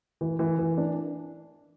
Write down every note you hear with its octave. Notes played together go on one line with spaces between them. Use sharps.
E3
E3
E3
D4